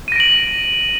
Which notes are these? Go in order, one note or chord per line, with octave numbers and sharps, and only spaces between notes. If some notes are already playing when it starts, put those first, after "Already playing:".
A#6 D7 D#7 F#7